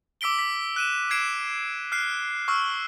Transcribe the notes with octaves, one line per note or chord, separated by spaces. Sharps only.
D6 E6 B6 D7 G7
B6
F#6 D#7 E7
G#6 C7 D7 E7
F6 F#6 C7
C#6 E6 F6